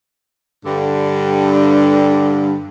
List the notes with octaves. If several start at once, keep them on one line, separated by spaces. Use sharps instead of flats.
G2 D3